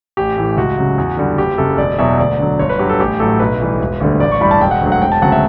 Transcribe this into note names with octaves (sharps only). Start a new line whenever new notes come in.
A1 G4
A2 E3
C#2 F#4
C#3 F#3
E2
D3 G3
F#1 G4
F#2 C#3 A4
E1 D5
E2 B2 F#3 E5
D2 D5
D3 F#3
G1 C#5
B4
G2 F#3 G4
A4
A1 G4
A2 F#3 A4
B1 B4
A2 E3 G3
E1
D2 D3 G3
A1 D5
C#6
G2 E3 G3 B5
A5
E1 G5
F#5
D2 D3 F#3
F#5
E1 G5
A5
D2 C#3 F#3 F#5
E5